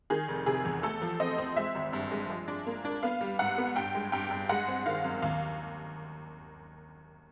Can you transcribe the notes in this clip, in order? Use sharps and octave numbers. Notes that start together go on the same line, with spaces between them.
D#3 G#4
F1
C3 G#4
E2
A3 A4
F3
C4 D#5
C4
G#3 E5
G#1
G2
G#3
F3
D4
A#3
D4
B3 F5
G3
G#2 F#5
B3
G2 G5
G#3
G2 G5
G2
G#3 F#5
C4
D#3 F5
F#2
D#2 F5